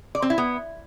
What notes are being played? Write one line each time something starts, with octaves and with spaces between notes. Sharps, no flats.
D5
C4
E4
B3